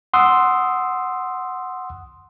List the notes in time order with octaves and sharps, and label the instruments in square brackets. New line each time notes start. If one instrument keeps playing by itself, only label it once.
[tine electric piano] F#5 C6 D#6 E6 F#6